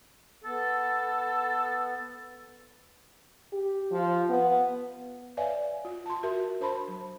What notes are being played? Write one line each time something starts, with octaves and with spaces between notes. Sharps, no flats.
B3 A4
G4
F3
B3
B4 C#5 D5 E5 F5 G#5
F4
A5 C6
F#4 A#4 E5
D4 C5 A5 B5 C6
F#3